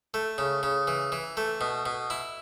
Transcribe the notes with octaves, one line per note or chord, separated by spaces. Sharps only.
A3
C#3
C#3
E3
E3
A3
B2
B2
E4